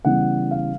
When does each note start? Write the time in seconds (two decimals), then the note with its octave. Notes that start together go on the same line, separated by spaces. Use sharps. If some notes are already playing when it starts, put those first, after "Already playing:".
0.05 C#3 E3 G3 B3 F#5
0.51 F5